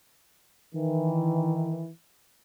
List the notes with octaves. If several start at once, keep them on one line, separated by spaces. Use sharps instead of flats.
D#3 E3